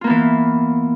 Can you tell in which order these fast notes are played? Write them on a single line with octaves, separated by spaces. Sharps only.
F4 A#3 B3 E3